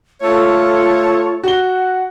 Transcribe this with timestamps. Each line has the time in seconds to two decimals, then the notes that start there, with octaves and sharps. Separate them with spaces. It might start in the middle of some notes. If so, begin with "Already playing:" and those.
0.22 A3 F4 A4 C#5
1.43 F#4 F#5 G7